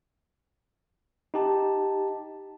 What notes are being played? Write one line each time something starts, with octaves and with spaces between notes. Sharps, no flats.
D#4 G4 A5